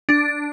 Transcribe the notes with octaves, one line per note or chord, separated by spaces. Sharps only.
D4